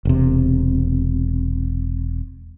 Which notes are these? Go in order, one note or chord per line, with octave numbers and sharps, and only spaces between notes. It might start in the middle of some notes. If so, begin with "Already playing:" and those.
E1 C3